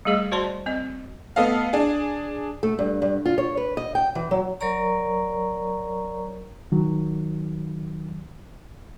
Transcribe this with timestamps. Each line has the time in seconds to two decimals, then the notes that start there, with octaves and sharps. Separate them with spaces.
0.05 G3 A3 G#4 D#5
0.32 F#4 C5 D5 A5 C6
0.66 C4 D#5
1.36 A3 B3 A4 D#5 F5
1.73 D4 G#4
2.63 A3
2.79 G2
3.02 G2
3.26 F4
3.38 C#5
3.57 B4
3.77 D#5
3.95 G5
4.15 E3
4.31 F#3
4.60 F#3 A#4 C#5 D5 A#5 C#6
6.72 D#3 F#3